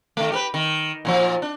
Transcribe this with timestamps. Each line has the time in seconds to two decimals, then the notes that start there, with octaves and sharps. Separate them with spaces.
0.17 D#3 A3
0.32 G4 A#4 B4
0.54 D#3
1.05 A#2 D3 F3
1.42 D4